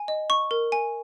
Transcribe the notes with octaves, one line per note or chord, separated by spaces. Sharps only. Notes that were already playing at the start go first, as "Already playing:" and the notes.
Already playing: G#5
D#5
C#6
A#4
G#5